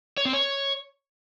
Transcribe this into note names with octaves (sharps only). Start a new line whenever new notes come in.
C#5
C4
C#5